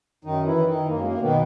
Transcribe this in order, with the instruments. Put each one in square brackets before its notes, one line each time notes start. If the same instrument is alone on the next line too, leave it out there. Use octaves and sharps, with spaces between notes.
[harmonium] F#2 D#3 D#4
E3 E4
D#3
D#3 D#4
F#2 A#3
G#3
A#3
B2 D#3 B3